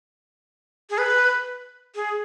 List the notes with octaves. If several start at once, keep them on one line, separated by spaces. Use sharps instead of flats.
G#4
B4
G#4